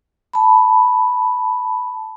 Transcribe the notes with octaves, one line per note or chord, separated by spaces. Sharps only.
A5 B5